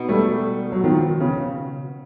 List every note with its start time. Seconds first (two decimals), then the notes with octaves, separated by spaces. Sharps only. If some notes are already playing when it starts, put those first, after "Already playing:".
Already playing: B2 D#4
0.08 G3 A3
0.72 F#3
0.84 D#3 F3
1.20 C#3